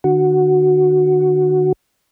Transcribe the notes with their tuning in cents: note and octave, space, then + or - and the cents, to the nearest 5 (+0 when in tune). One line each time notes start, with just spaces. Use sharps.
D3 +40 F#4 +0